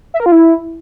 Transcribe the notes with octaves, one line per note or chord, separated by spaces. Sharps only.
E5
A#4
F4
E4